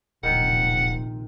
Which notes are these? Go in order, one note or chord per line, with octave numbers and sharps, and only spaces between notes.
D1 A#1 C3 D#3 F#5